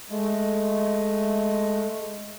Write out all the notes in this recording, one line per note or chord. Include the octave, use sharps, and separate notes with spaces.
G#3 A3